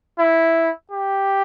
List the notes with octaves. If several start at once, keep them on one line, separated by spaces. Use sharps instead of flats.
E4
G4